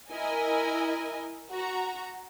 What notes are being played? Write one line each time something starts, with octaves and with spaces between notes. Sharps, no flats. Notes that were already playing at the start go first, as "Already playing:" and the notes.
E4 A#4 D#5 G#5
F#4 A#5